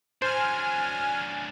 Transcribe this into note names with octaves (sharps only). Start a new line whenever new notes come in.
F#3 D4 C5 G#5 F6